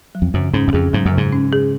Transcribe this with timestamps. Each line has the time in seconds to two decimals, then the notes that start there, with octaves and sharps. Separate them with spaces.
0.15 F#3
0.22 F2
0.34 F#2 C#3
0.53 G#2 C#4
0.68 F#2
0.73 F2 G#4
0.93 G#2 F#3
1.06 F#2
1.12 C#3
1.17 G#2
1.32 C#4
1.53 G#4